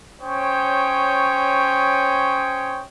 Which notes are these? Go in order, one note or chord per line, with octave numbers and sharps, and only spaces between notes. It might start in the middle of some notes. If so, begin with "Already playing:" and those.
C#4 C5 C#5 G5 C#6 D#6